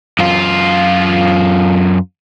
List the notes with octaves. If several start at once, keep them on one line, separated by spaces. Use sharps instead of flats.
F#2 F4